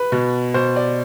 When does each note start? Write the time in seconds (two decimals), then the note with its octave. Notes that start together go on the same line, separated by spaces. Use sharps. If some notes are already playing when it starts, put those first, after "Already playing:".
Already playing: B4
0.12 B2
0.54 B2 C5
0.76 D5